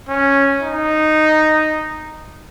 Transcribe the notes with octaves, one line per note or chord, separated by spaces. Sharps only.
C#4
D#4